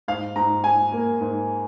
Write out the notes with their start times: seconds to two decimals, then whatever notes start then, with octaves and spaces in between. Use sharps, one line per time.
0.08 G#2 F5
0.36 G#2 A#5
0.64 G#2 G#5
0.92 A#3
1.21 G#2